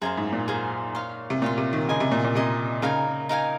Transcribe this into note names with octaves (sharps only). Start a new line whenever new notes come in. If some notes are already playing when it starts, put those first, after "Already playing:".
F#2 G#4 C5 F5 A#5
G#2
A#2
G#4 C5 F5 A#5
C#5 F5 C6
C3
A#2 C#5 F5 C6
C3
D#3
C#3 A#4 D#5 G#5 C6
C3
A#2
A#2
C3 A#4 D#5 G#5 C6
C#3 D#4 A#4 F5 G#5
D#4 A#4 F5 G#5